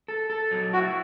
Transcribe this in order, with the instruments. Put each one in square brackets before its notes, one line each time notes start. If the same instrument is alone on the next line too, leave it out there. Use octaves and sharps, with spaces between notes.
[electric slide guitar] A4
A4
F#3
[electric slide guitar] E4 [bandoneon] F#4